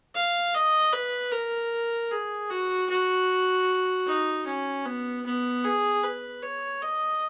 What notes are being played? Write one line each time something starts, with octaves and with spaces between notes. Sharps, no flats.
F5
D#5
B4
A#4
G#4
F#4
F#4
D#4
C#4
B3
B3
G#4
B4
C#5
D#5